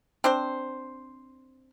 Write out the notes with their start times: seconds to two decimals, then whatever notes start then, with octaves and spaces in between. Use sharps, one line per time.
0.24 C4 D4 C5